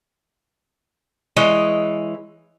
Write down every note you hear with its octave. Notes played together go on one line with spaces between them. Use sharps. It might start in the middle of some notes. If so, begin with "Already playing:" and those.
E3 G#3 C#5 D#5